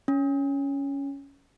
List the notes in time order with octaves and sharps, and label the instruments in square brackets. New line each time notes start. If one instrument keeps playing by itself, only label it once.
[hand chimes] C#4